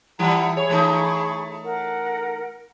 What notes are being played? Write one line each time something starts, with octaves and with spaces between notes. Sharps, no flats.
E3 G3 E4 F#5 G5 A#5
G#4 C#5 B5 C#6
E3 A3 D#4
A#4 F#5